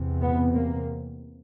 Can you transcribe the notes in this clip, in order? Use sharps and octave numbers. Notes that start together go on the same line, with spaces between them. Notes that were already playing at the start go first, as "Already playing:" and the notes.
Already playing: E2 C3
B3
A#3